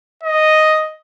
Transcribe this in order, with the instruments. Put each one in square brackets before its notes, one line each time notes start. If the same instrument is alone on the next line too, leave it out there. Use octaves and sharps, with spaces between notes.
[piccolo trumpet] D#5